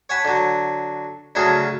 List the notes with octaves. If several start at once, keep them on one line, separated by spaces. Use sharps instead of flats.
C#5 F#5 G#5 A5 B5
D3 F#3
D2 C#3 F#3 G#4 A4